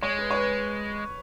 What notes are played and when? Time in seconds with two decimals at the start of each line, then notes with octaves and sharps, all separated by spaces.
0.02 G#3 C#5
0.19 B4
0.31 C#5
0.34 B4